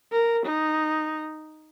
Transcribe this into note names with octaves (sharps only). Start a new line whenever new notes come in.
A#4
D#4